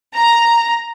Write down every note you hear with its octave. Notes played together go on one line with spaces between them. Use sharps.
A#5